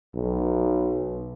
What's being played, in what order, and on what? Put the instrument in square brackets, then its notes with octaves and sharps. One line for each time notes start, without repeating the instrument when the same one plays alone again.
[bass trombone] B1